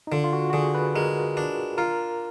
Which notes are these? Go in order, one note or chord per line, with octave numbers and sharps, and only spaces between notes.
D#4
D3 F4
F4
F#4
F#4
D3 G#4
B4
G#3 A#4
D4
F4 A#4